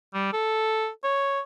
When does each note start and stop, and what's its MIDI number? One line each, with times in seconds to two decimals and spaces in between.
0.14 0.33 55
0.33 0.88 69
1.04 1.40 73